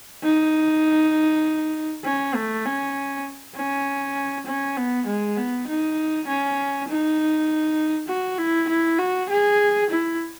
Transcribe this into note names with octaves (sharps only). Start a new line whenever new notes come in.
D#4
C#4
A3
C#4
C#4
C#4
B3
G#3
B3
D#4
C#4
D#4
F#4
E4
E4
F#4
G#4
E4